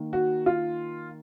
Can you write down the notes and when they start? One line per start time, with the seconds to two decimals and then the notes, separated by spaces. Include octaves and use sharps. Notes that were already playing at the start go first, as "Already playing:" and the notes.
Already playing: D#3 A#3
0.13 F#4
0.46 F4